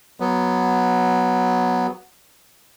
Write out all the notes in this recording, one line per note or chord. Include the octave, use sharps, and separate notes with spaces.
F#3 B3